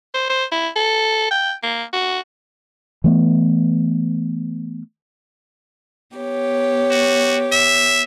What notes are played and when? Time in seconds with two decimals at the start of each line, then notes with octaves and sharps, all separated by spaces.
0.14 C5
0.30 C5
0.52 E4
0.76 A4
1.31 G5
1.63 A#3
1.93 F#4
3.04 E3 A3 B3
6.15 B3 G4 C#5
6.91 F#4
7.52 E5